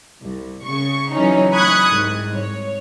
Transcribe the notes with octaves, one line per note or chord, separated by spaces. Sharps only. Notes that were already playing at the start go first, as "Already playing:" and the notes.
C2
C#3 C#6
C#3 E3 F#3 C#4 D#4
B5 C#6 D#6 F#6 G#6
C2 G#2
C#5